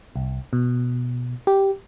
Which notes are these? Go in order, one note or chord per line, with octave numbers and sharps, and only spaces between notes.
C2
B2
G4